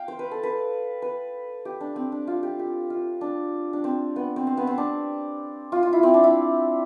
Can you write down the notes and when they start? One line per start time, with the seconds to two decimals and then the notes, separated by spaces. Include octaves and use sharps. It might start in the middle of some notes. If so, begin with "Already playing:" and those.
Already playing: F5 G5
0.08 C5
0.19 B4
0.31 A4
0.43 B4
1.02 B4
1.65 G4
1.81 D4
1.96 C4
2.12 D4
2.27 F4
2.43 G4
2.59 G4
2.90 F4
3.21 D4
3.73 D4
3.84 C4
4.16 B3
4.36 C4
4.47 C4
4.57 B3
4.67 C4
4.78 D4
5.72 F4
5.83 F4
5.93 E4
6.03 C4
6.14 D4
6.24 E4